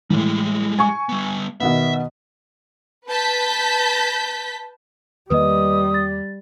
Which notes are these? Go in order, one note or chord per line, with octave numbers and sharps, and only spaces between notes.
A2 E3 G3 G#3
G#5 C#6
G3 B3
B2 D#3 B3 E5
B4 A5 G6 B6
E2 D#3 G3 A#3 B4 D#5 D#6
A6